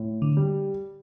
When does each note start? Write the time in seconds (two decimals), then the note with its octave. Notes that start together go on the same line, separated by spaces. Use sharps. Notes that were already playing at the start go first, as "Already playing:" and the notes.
Already playing: A2
0.22 D3
0.37 G3